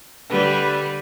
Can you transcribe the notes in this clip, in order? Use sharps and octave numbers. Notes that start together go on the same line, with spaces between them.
D3 G3 B4